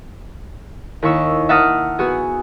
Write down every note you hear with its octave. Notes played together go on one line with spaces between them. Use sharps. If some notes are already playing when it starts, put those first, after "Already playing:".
D#2 E4 C#6 E6
E5 F#5 A5 A#5 D#6 F6
B3 F#4 G#4